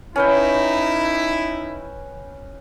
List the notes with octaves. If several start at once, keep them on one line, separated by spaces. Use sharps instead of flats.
C#4 D#4 E4 B4 G5